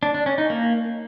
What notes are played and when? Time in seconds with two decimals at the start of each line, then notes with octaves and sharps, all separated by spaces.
0.03 D4
0.14 D4
0.26 C#4
0.38 D#4
0.50 A#3